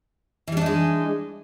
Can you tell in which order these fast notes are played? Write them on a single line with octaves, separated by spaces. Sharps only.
E3 G3 D4 D#4 G#3